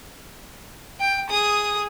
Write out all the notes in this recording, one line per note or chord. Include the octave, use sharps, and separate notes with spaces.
G5
G#4 D#6